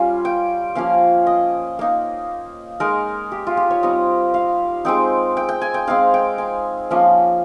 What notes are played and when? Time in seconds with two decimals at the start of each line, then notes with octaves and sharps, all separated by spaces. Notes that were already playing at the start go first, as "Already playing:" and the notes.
Already playing: G3 C#4 F4
0.25 G5
0.75 F3 A#3 C#4 F5
1.27 D#5
1.79 A#3 D#4
2.80 G#3 D#4 A#4
3.32 G4
3.47 F4
3.57 G4
3.70 C#5
3.83 G3 C4 D#4 D#5
4.34 F5
4.85 G#3 C4 D#4 G5
5.37 G5
5.49 G5
5.61 G#5
5.74 G5
5.87 G#3 C4 D#4 F5
6.14 G5
6.38 G#5
6.91 F3 A#3 C#4